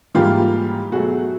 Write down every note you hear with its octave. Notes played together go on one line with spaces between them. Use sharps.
G#2 E3 G3 A#3 F4 G4
B2 F#3 A3 F#4 G#4